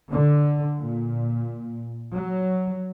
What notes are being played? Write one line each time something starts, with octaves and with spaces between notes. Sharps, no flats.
D3
A#2
F#3